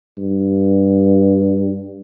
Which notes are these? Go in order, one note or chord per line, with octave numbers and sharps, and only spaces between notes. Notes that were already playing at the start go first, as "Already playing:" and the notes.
G2